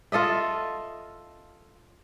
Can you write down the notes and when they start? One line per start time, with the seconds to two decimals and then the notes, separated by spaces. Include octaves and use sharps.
0.12 F4 A4 D#5 E5